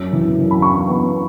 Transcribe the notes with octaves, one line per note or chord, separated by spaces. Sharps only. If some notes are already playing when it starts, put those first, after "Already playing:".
Already playing: F#2 E6
E3
F#2
B5
E3 C#6
B3